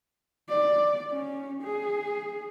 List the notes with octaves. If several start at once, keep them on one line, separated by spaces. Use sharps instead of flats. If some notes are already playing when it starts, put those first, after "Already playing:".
D5
C#4
G#4